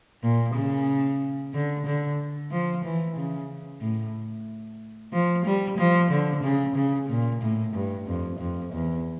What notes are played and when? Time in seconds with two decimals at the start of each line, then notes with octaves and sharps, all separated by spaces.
0.23 A#2
0.54 C#3
1.54 D3
1.86 D3
2.51 F3
2.84 E3
3.17 C#3
3.81 A2
5.13 F3
5.45 G3
5.78 F3
6.10 D3
6.43 C#3
6.76 C#3
7.09 A#2
7.42 A2
7.75 G2
8.07 F2
8.39 F2
8.73 E2